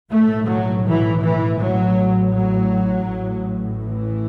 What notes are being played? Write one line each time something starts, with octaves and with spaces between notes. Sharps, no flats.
B1 A2 A3
F#3
E3
E3
A1 A2 F#3
F#3
A1 A2
E3